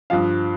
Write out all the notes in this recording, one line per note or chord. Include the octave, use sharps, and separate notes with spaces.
G2 F3 F5